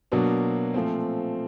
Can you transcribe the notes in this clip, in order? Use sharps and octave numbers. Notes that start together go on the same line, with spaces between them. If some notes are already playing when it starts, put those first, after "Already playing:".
B2 F#3 A#3 D4 F#4
A#2 F3 A3 C4